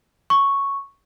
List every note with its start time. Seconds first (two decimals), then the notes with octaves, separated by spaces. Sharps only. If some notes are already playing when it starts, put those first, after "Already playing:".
0.30 C#6